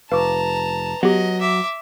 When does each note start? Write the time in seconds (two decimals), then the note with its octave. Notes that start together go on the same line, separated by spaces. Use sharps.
0.12 F1 B4 F5 A5 A#5 C#6 D6
1.03 F#3 B3 G4 D#5
1.41 E5 D6